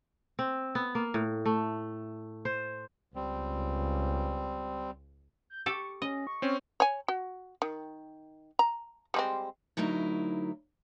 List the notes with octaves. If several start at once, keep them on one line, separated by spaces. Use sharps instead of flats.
C4
B3
A#3
A2
A3
C5
C#2 G3 C4
G6
G4 A4 C#6
C#4 D#5
C#6
C4 C#4
C#5 G#5
F#4
D#3
A#5
G3 G#3 C4
D2 F#3 D#4 E4 A#4